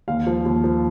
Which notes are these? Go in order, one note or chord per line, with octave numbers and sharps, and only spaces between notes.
D#2 F5
F3
D#2
F3